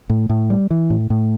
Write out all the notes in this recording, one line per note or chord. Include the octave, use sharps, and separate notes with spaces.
A2
A2
G3
E3
A2
A2